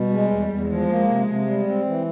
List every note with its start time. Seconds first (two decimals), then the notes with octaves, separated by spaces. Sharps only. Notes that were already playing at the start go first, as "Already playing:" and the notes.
Already playing: B2 G3
0.10 G#3
0.30 E2
0.49 E2
0.69 F3 G#3
0.89 A#3
1.08 C3
1.27 C3
1.46 G3
1.66 C4
1.86 E3